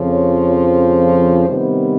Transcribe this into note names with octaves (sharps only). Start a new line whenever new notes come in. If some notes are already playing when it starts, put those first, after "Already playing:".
Already playing: F2 C#3 F3
C#5
C5
C3 D#3 G3 B3